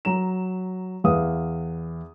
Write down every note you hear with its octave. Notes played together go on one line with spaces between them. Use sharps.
F#3 A#5 E7
E2 B4 F5 D#6